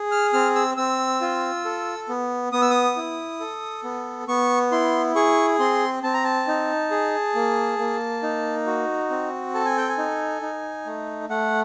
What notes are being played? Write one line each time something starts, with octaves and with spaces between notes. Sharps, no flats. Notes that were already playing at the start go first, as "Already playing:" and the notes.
Already playing: G#4
F6
C4 F6
E6
C4 E6
F4
A4
B3
B3 D#6
E6
D#6
E4
A4
B3
B3 C#6
E4 C6
G#4 C#6
C4 C6
C4 A5
A#5
A5
D#4
G#4
A#3
A#3
D#4
F#4
C4
A4 A5
G#5
G5
G#5
D#4
D#4
A3
A3 F#5